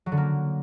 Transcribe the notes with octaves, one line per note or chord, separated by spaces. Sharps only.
F#3
D3
A#3